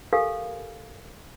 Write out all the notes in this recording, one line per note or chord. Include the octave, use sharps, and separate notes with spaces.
G4 A4 A#4 F5 G#5